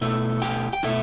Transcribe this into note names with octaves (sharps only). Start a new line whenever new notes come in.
B2 A3 E4
G4 G5
G5
B2 A3 E4 E5